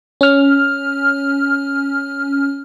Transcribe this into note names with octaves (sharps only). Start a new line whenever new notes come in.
C#4 F6